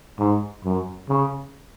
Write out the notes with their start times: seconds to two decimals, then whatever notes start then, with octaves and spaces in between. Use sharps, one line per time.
0.19 G#2
0.65 F#2
1.09 C#3